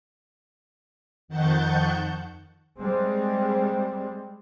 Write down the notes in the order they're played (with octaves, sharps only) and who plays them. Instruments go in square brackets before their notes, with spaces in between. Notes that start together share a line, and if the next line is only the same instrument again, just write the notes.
[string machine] F2 D#3 F#5 A5 C#6 G6
[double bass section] G3 G#3 C4